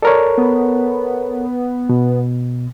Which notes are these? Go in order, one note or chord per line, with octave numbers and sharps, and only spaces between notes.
A4 A#4 C#5 D5
B3
B2